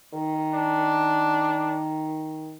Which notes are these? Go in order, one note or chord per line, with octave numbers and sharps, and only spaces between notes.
D#3
D4